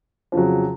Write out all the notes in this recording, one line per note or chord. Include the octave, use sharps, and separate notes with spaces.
F2 C#3 F#3